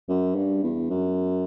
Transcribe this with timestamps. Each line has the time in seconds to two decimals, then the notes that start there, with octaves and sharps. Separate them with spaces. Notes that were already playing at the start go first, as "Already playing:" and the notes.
0.09 F#2
0.35 G2
0.63 E2
0.90 F#2